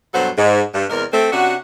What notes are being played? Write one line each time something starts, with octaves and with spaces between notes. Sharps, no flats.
G2 B2 F#3 F#4 A4 C5
G#2
G2
E2 C3 G#3 A#4
A3 C4
C3 C#4 D4 F#4